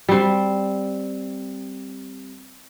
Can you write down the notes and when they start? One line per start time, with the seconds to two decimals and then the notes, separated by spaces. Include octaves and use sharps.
0.09 G3 C4